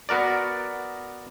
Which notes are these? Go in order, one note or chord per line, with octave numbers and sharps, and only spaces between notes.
B3 F#4 A#4 D5